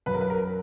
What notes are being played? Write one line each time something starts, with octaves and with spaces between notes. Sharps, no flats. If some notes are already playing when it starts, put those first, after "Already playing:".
F#2 B4
A#4
B4
A#4